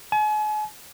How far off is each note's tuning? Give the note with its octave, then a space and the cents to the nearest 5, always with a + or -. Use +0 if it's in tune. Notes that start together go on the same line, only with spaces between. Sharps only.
G#5 +40